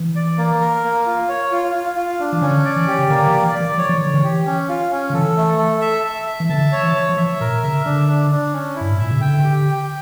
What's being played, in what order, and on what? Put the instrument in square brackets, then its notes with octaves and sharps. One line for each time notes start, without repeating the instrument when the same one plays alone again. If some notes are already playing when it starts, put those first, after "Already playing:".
Already playing: [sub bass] E3
[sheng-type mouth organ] D5
A#3
A#4
A#3
F4
C#5
F4
F4
F4
D4
[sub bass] E3
[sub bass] D3 [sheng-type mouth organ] C#4
[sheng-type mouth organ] D5
[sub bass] E3
[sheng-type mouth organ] G4
[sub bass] C#3
[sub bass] D3 [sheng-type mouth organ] A#3
[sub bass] E3
[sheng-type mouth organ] D5
[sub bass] E3
[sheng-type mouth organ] D5
[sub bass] E3
[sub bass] F3 [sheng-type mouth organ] C#5
[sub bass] E3
[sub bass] D3 [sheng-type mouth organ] C#5
[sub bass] E3
[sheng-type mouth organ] G4
C#4
F4
C#4
[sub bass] D3
[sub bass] E3 [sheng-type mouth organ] A4
[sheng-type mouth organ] A3
A4
E5
E5
E5
[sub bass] E3
[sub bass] D3 [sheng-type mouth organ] A5
[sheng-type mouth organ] C#5
[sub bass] E3
[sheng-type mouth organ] C#5
[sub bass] F3
[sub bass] E3 [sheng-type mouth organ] E5
[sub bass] A#2 [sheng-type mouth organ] A#4
[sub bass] C#3 [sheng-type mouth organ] E5
[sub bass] D3 [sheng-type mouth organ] D4
[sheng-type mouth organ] D4
D4
C#4
E4
[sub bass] G2
A2
[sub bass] A#2 [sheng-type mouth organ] E5
[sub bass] C#3
[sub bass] D3 [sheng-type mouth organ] G5
[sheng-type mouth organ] G4
G5